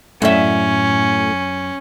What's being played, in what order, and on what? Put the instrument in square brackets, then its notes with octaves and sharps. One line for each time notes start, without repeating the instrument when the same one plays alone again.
[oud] F#2 E5 [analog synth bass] A2 [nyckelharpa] C#4